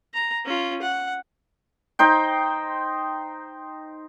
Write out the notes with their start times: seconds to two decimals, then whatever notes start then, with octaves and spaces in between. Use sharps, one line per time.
0.14 A#5
0.45 C#4 F4
0.82 F#5
1.99 D#4 C5 G5